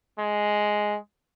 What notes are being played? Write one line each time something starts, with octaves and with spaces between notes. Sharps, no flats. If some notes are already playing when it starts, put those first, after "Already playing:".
G#3